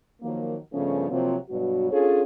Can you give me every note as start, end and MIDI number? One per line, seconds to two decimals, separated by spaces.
0.22 0.56 51
0.22 0.56 53
0.22 0.56 54
0.22 0.56 58
0.73 1.09 43
0.73 1.09 49
0.73 1.09 53
0.73 1.09 57
0.73 1.09 59
0.73 1.09 61
1.10 1.36 48
1.10 1.36 53
1.10 1.36 54
1.10 1.36 58
1.10 1.36 60
1.10 1.36 65
1.50 1.90 43
1.50 1.90 47
1.50 1.90 54
1.50 1.90 66
1.91 2.22 61
1.91 2.22 62
1.91 2.22 65
1.91 2.22 68
1.91 2.22 69
1.91 2.22 73